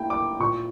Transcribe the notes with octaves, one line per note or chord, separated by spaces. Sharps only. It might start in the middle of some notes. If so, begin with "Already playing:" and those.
Already playing: A#3 E4 G5
D6
A#2 C#6